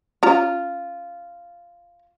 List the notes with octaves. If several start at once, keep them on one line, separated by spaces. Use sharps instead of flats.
C#4 F4 A#5